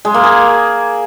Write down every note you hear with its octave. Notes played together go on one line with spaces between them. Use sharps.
G#3
A#3
G#4